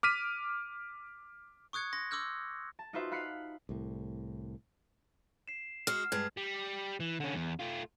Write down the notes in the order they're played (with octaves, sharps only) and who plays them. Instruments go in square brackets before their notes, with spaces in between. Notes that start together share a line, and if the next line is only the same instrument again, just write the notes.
[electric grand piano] D6 F6 B6 D#7
[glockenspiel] C#6 D#6 F#6 G#6 C#7
C6 A#6
C6 D6 E6 F6 G6
[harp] A5
D#4 F4 F#4 B4 C5 E5
F5 B5 F#6 C7 C#7
[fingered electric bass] C2 A2
[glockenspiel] C7 E7
[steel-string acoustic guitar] G#3 F#4 [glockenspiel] F6
[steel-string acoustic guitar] G2 G#3 [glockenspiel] G#6
[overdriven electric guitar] G3
E3
D3 C#4
E2
A3 F4